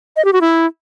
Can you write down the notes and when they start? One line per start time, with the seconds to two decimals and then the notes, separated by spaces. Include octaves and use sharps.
0.16 D#5
0.25 G4
0.33 F#4
0.41 E4